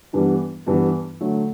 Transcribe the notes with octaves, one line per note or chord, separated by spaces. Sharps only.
G2 E3 G3 B3 D4
G2 E3 G3 B3 D4
D3 F#3 A3